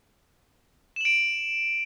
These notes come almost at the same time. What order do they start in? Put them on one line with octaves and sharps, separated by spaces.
E7 F#7 D7